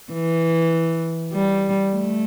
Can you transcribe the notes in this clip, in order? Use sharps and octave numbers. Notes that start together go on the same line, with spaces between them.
E3
G3
A3